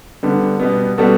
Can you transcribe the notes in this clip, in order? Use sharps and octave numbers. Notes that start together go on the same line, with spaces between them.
D3 G3 B3
B2 G3 B3
B2 G3 B3 F#4 A4